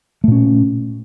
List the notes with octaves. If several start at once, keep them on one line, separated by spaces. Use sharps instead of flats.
A#2 A3 C#4